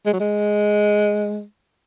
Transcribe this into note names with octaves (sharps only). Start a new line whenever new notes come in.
G#3
F#3
G#3